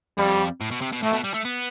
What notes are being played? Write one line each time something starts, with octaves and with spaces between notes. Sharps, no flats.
F2 G3
A2
B2
C3
B2
A2 A3
B2
G3
A3
B3